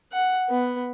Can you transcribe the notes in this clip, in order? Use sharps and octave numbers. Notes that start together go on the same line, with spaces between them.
F#5
B3